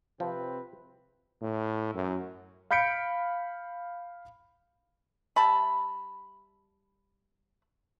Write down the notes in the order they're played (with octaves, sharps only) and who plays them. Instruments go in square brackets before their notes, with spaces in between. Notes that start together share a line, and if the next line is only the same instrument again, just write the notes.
[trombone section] C3 C4 B4 [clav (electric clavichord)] F3
[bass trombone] A2
F#2
[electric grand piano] F5 B5 G6 B6 C#7 D7
[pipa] G3 E5 A5 B5